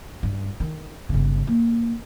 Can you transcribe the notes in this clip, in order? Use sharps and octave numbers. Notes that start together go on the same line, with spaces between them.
G2
D#3
G1 C#3
A#3